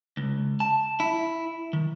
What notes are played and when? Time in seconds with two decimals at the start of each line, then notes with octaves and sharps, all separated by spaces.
0.17 C#2
0.60 A5
1.00 E4
1.73 D#3